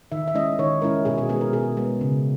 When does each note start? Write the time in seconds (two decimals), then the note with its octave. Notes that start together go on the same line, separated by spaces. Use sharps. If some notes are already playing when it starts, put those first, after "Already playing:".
0.12 D#3 E5
0.28 E5
0.34 G#3 C#4 E4 D#5
0.59 D#3 C#5
0.82 G#3 C#4 E4 A#4
1.05 B2 G#4
1.18 G#4
1.29 G#3 B3 G#4
1.41 A#4
1.53 B2 G#4
1.77 G#3 B3
2.01 C#3